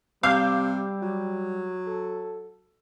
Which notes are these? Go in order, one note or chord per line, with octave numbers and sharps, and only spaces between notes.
C3 G3 F5 D6 E6 G6
F#3
A4